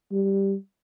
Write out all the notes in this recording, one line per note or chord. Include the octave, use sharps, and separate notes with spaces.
G3